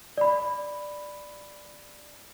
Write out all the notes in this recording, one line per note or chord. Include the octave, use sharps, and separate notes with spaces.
D5 B5